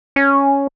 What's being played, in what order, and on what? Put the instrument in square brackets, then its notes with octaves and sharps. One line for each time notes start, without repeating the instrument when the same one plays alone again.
[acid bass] C#4